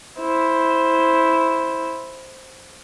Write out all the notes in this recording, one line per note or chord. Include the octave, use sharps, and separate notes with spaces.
E4 C5